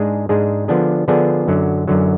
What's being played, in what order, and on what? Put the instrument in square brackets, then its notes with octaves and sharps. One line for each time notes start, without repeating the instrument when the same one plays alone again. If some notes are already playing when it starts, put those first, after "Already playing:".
Already playing: [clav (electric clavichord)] G#2 G#3 D4 G#4
G#2 G#3 D4 G#4
D3 F3 B3 D4 G#4
D3 F3 B3 D4 G#4
F#2 D3 F#3
F#2 D3 F#3